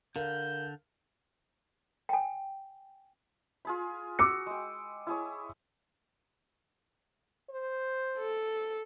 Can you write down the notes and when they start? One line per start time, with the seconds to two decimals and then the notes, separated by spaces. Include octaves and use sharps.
0.16 D3 A#4 F5 G6
2.09 G5 G#5
3.65 F4 G#4 B5
4.19 F#4 D6 E6 C#7
4.46 G#3 G5
5.07 E4 G#4 C#5
7.50 C5
8.18 A4